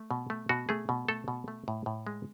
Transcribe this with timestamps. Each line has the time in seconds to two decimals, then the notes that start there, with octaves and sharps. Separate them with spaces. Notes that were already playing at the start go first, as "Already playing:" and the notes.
Already playing: A3
0.11 B2
0.30 A3
0.49 B2 F#4
0.69 A3 G#4
0.89 B2
1.09 A3 A4
1.28 B2
1.48 A3
1.68 A2
1.86 A2
2.07 G#3